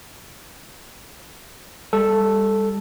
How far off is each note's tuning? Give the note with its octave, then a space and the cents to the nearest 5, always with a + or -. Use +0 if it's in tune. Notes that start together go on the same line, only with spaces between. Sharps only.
G3 +30 A4 +0